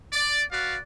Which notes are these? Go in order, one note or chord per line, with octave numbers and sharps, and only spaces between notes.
D5
F#4 B4 D5 F5